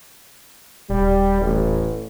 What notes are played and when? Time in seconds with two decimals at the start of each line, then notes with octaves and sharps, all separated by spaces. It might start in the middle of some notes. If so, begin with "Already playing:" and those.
0.90 D#1 G3
1.41 A1